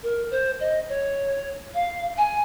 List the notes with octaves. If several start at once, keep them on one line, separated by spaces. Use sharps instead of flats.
A#4
C5
D#5
C#5
F5
G#5